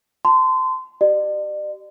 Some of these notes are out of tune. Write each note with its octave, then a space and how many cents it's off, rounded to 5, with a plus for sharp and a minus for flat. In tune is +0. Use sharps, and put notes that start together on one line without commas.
A5 +20 C6 -25
G4 -25 D5 +40